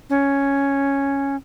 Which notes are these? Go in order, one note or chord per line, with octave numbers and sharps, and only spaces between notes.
C#4